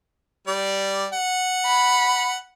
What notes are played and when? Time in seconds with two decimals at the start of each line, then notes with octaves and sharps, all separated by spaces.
0.47 G3 D5
1.13 F#5
1.66 B5